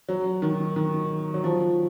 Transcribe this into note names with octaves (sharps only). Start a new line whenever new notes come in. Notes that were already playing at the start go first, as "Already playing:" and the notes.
F#3
D#3
D#3
F#3
F3